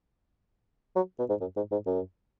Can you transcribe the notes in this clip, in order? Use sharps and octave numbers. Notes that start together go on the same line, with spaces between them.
F#3
B2
G#2
F#2
G#2
G#2
F#2